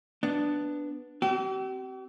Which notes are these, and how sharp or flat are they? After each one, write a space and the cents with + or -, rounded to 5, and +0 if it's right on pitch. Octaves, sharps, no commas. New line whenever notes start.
B3 +0 D4 +0
C4 +0 G4 -45